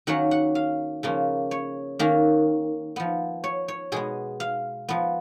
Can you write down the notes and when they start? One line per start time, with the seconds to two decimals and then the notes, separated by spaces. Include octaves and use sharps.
0.07 D#3 F#3 A#3 C#4 F#5
0.31 F#5
0.55 F5
1.03 C#3 F3 A#3 C#4
1.51 C#5
1.99 D#3 A#3 C#4
2.96 F3 B3
3.44 C#5
3.68 C#5
3.92 B2 G#3 B3 G#4
4.40 F5
4.89 F3 B3